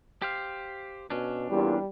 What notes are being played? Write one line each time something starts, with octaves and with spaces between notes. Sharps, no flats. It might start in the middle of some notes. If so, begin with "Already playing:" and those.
G4 C5 F5
B2 C#4 D4
E2 G2 A#2 G3